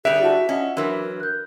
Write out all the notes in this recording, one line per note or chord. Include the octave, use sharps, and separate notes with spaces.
D3 G3 G#4 E5 F#6 D7 F7
E4 F#4 A5
C#4 F4 D#5 F#5
E3 F#3 D4 A#4 C6 E6
F#6 G6